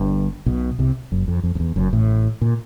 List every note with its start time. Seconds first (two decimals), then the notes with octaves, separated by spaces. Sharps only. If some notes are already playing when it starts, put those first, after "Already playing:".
Already playing: G1 G2
0.46 B1 B2
0.79 C2 C3
1.12 F#1 F#2
1.28 F2
1.43 F2
1.55 F2
1.60 E2
1.76 F#1 F#2
1.93 A1 A2
2.41 A#2